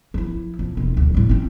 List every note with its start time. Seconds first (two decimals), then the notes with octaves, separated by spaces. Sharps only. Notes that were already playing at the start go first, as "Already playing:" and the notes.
0.14 F3 E4
0.59 F2
0.77 E1 F4
0.97 D2
1.14 A2 G3
1.29 C4 C#4